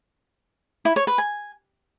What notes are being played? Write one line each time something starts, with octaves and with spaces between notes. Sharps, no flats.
E4
C#5
B4
G#5